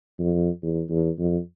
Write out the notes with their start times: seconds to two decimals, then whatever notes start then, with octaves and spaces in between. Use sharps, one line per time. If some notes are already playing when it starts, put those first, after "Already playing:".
0.19 F2
0.62 E2
0.90 E2
1.18 F2